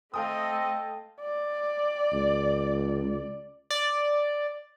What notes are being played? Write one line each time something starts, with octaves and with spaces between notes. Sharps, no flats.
A3 C4 A4 D#5 F5 G5 D#6
D5
C#2
D5